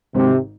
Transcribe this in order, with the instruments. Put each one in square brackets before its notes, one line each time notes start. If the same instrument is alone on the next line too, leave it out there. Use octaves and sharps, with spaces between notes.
[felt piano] G#1 G#2 D#3 C4 [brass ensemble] C3